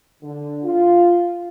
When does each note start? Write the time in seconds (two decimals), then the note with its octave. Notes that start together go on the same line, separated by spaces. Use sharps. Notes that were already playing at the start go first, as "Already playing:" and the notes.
0.23 D3
0.64 F4